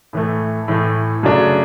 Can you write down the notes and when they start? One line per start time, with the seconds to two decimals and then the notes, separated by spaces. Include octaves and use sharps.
0.13 A2 E3 A3
0.68 A2 E3 A3
1.23 F#2 C#3 F#3 A3 D4